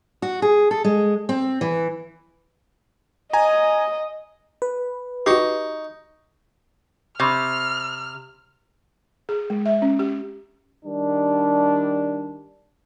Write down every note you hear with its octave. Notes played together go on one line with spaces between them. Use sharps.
F#4
G#4
A4
G#3
C4
E3
D#5 G#5 A#5
B4
D#4 F#4 G4 C#6
C3 B5 C#6 F6 G6
G#4
G#3
E5
C#4
G4
D#3 G3 D4